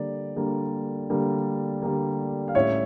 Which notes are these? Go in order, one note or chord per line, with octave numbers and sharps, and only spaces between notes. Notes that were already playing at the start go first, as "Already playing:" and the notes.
Already playing: D3 G3 A#3 D5
D3 G3 A#3
D3 G3 A#3
D3 G3 A#3
F5
A2 G3 C#4 C#5 E5